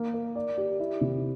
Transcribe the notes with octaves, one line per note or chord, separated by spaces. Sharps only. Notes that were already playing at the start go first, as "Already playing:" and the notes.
Already playing: A#3 A#4
A#4
D5
G4
E4
C3